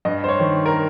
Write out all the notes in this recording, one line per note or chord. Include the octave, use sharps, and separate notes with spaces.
G2 D#5
C5
C#5
D#3
A#4